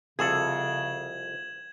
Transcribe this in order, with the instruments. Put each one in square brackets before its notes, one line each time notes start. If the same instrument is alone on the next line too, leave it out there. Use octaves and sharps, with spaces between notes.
[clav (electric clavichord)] C2 F2 A4 [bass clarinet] C#3 [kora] G#4 [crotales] G#6 E7 F#7